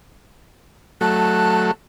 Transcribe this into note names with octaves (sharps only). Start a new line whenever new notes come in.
F#3 A3 A5 F#6